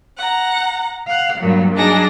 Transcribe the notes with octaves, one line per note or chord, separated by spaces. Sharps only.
F#5 A#5
F5 F#5
G2 A#2 F#3
F#3 D4 D#4 G#4 A#6